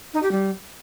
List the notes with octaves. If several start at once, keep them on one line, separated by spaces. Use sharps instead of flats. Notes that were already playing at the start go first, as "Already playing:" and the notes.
D#4
G4
G3